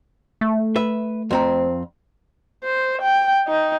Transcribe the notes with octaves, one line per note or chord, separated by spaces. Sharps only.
A3
B4 E5
F2 C4 A#5
C5
G5
D#4